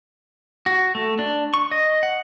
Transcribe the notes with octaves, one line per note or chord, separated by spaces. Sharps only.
F#4
A3
D4
C#6
D#5
F#5